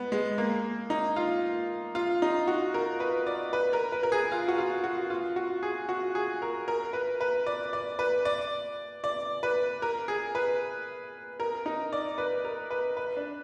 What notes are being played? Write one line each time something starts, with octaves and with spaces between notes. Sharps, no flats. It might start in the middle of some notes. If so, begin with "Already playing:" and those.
Already playing: G#3 B3
G#3
A#3
D#4
F4
F4
D#4
F#4
A#4
B4
D5
B4
A#4
B4
A#4
G#4
F4
F#4
F4
F#4
F4
F#4
G#4
F#4
G#4
A#4
A#4
B4
B4
D5
D5
B4
D5
D5
B4
A#4
G#4
B4
A#4
D#4
D5
B4
A#4
B4
B4
D4